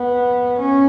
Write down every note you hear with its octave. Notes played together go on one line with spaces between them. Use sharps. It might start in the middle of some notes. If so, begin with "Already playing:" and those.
Already playing: B3
C#4